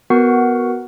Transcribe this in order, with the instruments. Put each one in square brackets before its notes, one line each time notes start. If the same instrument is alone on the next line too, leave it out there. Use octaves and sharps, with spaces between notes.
[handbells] B3 F#4 A#4 F#5